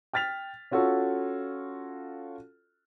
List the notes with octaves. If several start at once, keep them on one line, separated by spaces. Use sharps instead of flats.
G5 F6 A6 B6 F7
C#4 F4 F#4 A4 C#5